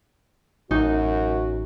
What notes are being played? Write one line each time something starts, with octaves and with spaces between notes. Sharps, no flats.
A1 F#2 D#4 F#4